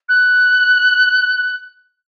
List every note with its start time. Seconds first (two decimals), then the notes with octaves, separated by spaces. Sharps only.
0.08 F#6